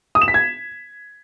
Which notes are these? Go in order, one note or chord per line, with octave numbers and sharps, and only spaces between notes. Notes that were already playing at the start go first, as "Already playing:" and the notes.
D#6
E7
B6
G#6